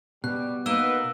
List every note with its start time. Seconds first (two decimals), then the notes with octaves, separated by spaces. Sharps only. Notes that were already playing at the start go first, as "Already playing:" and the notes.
0.24 B2 G3 F#6
0.66 A#3 B3 D#4 B4 E6 E7 G7